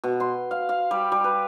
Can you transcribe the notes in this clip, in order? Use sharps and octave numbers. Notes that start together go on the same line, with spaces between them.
B2
C6
F5
F5
G3
G3
B4